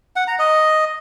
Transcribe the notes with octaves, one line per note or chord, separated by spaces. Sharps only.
F#5
A#5
D#5